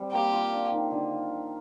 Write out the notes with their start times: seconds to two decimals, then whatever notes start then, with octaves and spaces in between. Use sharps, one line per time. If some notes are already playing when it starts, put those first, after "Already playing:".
Already playing: G3 C4
0.12 A#3 G4
0.31 F4
0.52 D4
0.71 D#3
0.91 D3